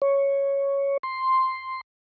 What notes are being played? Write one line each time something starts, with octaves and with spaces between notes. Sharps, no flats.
C#5
C6